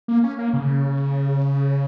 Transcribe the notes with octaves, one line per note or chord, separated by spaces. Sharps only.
A#3
C#4
A#3
C#3